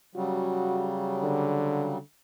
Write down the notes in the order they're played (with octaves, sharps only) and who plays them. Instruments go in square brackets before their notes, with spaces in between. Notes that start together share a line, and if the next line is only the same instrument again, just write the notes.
[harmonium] C#3 F#3 G3 [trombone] F#4
[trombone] D3